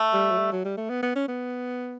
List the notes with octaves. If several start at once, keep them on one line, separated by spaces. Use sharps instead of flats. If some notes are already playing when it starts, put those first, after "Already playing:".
Already playing: A3
G3
F#3
G3
F#3
G3
A3
B3
B3
C#4
B3